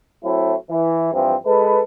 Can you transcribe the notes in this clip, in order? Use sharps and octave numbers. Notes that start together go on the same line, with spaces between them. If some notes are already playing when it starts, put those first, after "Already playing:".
F#3 A3 C4 E4
E3
G2 E3 F3 C4
G#3 A4 B4